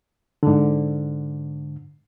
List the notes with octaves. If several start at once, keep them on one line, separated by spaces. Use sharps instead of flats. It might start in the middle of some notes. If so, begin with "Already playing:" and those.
G#2 D3